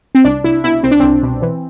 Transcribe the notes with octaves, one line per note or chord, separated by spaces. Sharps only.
C4
C2 D4
C2 E4
B2 E4
C2 C4
D4
C2 C4
B2
E3